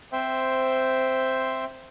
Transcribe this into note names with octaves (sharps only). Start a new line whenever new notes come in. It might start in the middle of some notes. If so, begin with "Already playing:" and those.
C4 C5 E5 G5